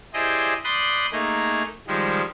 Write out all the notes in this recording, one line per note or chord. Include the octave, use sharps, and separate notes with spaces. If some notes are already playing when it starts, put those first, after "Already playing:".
E4 G4 G#4 C5 D5 D#5
D5 B5 C6 D#6 F#6 G6
A3 A#3 D#4 G#4
D#3 F3 G3 G#3